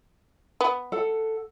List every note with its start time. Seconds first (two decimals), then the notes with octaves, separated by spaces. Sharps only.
0.61 B3
0.92 A4 F#5